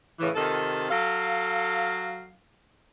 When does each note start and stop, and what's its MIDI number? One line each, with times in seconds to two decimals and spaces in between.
0.19 0.29 45
0.19 0.29 49
0.19 0.29 52
0.35 0.87 48
0.35 0.87 51
0.35 0.87 65
0.35 0.87 69
0.90 2.32 54
0.90 2.32 69
0.90 2.32 77